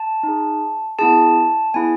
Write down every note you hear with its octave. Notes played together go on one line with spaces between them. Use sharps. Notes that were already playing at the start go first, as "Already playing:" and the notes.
Already playing: A5
D#4 G#4
B3 E4 G#4 A5
B3 E4 G#4 G#5